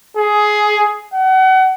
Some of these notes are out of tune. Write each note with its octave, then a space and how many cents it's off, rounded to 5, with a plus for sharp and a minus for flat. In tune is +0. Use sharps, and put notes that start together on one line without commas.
G#4 +15
F#5 +30